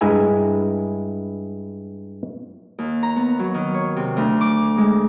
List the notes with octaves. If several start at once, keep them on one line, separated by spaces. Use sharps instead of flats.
G2 G#3 E4 E5 G#5 A#5
D#2
A#5
B3
F#3
D#3
C#5
C3
D2
D6
G#3